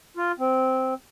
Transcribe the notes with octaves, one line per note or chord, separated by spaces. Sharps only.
F4
C4